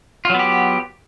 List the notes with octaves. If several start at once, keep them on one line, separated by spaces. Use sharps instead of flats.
F#3 B3 F4 G4